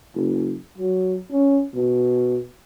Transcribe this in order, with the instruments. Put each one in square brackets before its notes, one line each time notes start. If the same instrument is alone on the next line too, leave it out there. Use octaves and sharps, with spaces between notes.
[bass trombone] F#1
F#3
C#4
B2